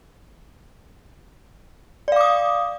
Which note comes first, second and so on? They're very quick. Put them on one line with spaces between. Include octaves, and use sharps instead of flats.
D5 F5 D6 D#6